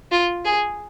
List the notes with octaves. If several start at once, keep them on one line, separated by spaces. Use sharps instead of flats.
F4
G#4